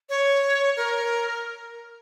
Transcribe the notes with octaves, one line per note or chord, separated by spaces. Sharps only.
C#5
A#4